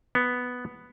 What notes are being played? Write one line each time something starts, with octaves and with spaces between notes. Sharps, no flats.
B3